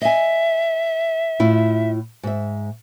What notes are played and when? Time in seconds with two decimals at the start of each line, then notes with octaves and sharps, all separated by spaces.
0.02 D#5 E5 G#5
1.40 A2 E4 F4
2.23 G#2 E5